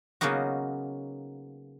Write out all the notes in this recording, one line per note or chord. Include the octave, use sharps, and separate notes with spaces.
C#3 F#3 A#3 B3 D#4 F#4